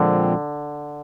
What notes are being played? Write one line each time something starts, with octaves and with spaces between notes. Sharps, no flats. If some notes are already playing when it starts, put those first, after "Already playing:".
Already playing: A#2 D3 F3 G#3 C4